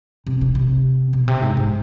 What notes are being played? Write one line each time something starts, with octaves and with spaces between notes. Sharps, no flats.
C3
C3
C3
B2
C3
G#2
G#2